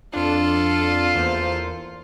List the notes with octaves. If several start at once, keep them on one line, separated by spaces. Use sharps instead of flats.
F2 D4 F4 A4
E2 A#3 C5